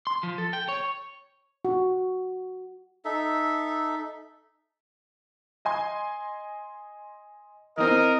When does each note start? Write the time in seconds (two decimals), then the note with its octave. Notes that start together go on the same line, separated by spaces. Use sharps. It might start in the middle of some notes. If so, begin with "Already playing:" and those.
0.07 C6
0.23 F3
0.38 A4
0.53 G5
0.69 C#5
1.65 F#4
3.05 D#4 A4 E5
5.65 D#5 G#5 C6
7.77 E3 C4 A#4 D#5